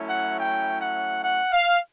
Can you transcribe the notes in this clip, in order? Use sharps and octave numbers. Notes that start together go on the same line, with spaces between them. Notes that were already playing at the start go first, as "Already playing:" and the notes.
Already playing: F#3 A3 C#4 E4
F#5
G5
F#5
F#5
F5